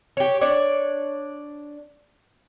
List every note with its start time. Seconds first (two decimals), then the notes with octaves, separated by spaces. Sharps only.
0.17 G4 C#5
0.41 D4 C#5 D5